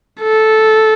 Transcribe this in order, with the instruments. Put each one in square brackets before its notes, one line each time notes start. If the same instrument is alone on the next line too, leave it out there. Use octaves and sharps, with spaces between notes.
[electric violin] A4